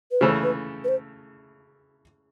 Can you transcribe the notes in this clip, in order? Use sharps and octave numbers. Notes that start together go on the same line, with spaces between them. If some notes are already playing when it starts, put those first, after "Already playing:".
B4
C#3 E3 A3 C5
B4
B4
C5